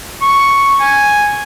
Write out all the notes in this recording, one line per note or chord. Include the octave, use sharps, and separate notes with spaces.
C#6
G#5